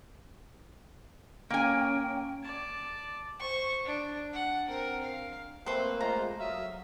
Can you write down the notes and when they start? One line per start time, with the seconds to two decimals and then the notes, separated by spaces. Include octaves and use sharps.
1.50 A#3 C#4 G5 G#5
2.42 D5 A5
3.40 C5 C#6
3.85 D4
4.34 F#5
4.67 C4 A#4
5.03 F5
5.66 A3 A#3 C4 B4 C5 C6
6.01 G#3 A3 F4 C5 A#5
6.40 F#3 E5 F5 D#6